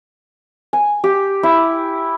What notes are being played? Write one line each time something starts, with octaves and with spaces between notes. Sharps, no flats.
G#5
G4
E4